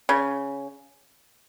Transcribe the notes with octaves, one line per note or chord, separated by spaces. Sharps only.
C#3